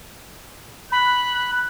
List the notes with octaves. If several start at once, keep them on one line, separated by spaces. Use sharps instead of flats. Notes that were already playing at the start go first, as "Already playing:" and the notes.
B5 F#6